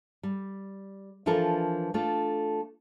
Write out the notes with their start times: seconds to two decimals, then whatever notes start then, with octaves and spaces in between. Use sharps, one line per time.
0.23 G3
1.26 E3 F3 D4 F4 A4 A#4
1.94 A3 D4 F4 A4